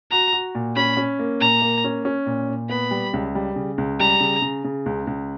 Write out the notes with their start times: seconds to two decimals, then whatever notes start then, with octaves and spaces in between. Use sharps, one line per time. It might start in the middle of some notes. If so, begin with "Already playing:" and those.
0.11 F#4 A#5
0.33 F#4
0.55 A#2
0.76 C#4 B5
0.97 C#4
1.19 A#3
1.41 A#2 A#5
1.62 A#3
1.84 C#4
2.05 C#4
2.26 A#2
2.49 A#2
2.69 B3 B5
2.91 G3
3.13 C#2
3.35 G3
3.56 C#3
3.78 C#2
4.00 G3 A#5
4.20 C#3
4.42 C#3
4.64 C#3
4.86 C#2
5.07 C#2